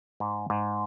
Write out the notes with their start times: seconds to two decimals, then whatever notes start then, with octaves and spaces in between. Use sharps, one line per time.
0.20 G#2
0.50 G#2